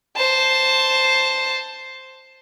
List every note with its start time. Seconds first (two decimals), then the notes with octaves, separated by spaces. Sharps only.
0.16 C5 A5